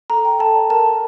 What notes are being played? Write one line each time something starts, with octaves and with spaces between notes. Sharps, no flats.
A4 A#5
G5
A4 A5
D5
A#4 A5
A#4